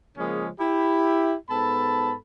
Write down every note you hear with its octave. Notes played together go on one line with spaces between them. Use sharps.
C#3 F3 G#3 A#3 C#4 G#4
E4 G4
G#2 B3 A4 A5 B5